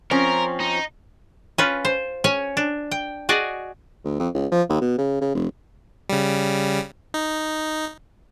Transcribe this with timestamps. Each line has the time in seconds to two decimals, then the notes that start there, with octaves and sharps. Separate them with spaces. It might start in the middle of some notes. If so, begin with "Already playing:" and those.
0.11 F3 C4 C#4 A#4
0.60 D#4
1.58 C#4 F4 B4
1.85 C5
2.24 C#4 C#5 G#5
2.57 D4
2.91 G5
3.29 F#4 G#4 D5 D#5
4.04 D2
4.20 F2
4.34 C#2
4.52 F3
4.69 D#2
4.81 B2
4.98 C#3
5.21 C#3
5.35 F1
6.09 C#3 G3
7.14 D#4